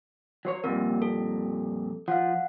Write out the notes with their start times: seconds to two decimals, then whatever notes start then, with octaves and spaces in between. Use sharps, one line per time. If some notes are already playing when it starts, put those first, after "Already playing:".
0.45 F#3 C5 C#5
0.64 F2 A#2 G3 A#3 C4 A#4
1.02 A4
2.08 F3 F5 F#5